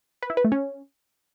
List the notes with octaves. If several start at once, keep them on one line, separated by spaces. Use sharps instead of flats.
B4
E4
B4
A3
C#4